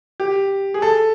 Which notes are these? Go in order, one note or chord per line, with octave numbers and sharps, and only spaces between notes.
G4
G#4
A4